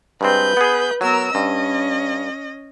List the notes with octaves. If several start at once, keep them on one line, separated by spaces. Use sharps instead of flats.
G2 G#3 C4 B4 G6
B3 G#4
F#3 B3 A#4 E6
G2 C#4 D#5